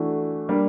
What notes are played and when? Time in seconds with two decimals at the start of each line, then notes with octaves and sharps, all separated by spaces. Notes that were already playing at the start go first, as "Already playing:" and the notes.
Already playing: E3 A3 D4 F#4
0.49 G3 A#3 D4